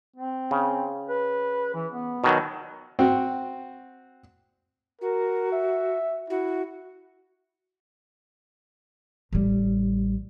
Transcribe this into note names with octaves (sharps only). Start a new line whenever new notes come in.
C4
C#3
B4
E3
B3
B2 D#3 F#3
C4 F#4
F#4 A#4
E5
E4 F#4
A1 G3